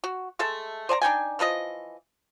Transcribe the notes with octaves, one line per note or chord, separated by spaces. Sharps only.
F#4
G#3 A3 A4 E5
C5 D5 G#5 A#5
D4 D#4 G5 G#5
E3 F3 A#4 D#5